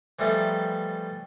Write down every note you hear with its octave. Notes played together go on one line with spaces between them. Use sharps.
E3 F3 G3 A3 D#4 A4